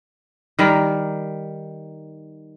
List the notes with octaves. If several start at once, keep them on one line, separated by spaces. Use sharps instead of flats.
D#3 G3 A#4